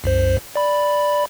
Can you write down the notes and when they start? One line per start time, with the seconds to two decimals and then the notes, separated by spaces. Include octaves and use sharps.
0.04 C2 F#2 C5
0.56 D5 B5